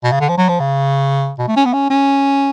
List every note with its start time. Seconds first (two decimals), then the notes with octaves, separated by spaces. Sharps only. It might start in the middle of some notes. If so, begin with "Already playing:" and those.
0.04 B2
0.12 C#3
0.21 D3
0.29 F3
0.38 F#3
0.49 F3
0.60 C#3
1.39 B2
1.48 A3
1.57 C#4
1.65 B3
1.73 C#4
1.90 C#4